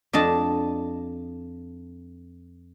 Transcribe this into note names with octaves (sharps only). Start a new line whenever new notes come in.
F2 D4 D#5 A5